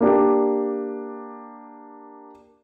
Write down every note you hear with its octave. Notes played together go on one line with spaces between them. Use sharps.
A#3 D4 G4